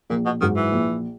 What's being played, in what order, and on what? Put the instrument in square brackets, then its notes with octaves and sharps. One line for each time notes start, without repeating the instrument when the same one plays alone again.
[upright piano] A#1 [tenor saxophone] A#2
[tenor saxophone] B2
[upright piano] G#2 F#3 [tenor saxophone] D#3
[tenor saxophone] E3
[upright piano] A#1